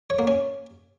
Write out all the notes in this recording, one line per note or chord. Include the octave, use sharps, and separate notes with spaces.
C#5
A#3
C#4